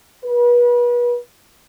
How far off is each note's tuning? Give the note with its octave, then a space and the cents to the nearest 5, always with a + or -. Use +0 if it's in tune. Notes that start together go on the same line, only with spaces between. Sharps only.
B4 -35